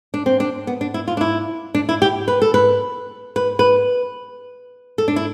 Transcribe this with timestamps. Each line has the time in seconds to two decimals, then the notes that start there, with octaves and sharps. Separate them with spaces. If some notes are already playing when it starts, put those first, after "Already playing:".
0.14 D4
0.26 C4
0.40 D4
0.67 B3
0.81 D4
0.94 E4
1.08 F4
1.17 D4
1.21 E4
1.75 D4
1.89 E4
2.02 G4
2.28 B4
2.42 A4
2.54 B4
3.36 B4
3.59 B4
4.98 A4
5.08 D4
5.16 E4